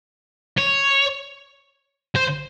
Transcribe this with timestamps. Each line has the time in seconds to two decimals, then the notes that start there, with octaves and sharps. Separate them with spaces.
0.57 C#5
2.16 C5